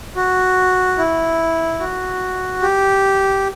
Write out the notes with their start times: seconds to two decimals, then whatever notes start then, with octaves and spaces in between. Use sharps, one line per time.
0.16 F#4
0.98 E4
1.80 F#4
2.62 G4